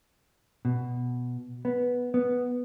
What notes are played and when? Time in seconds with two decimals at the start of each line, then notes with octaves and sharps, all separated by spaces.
0.65 B2
1.65 B3
2.14 B3